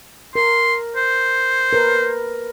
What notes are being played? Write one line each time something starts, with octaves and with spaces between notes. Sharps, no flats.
A#4 C6
C5
A#4 B4